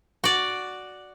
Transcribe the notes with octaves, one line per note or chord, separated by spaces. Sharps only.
F#4 D5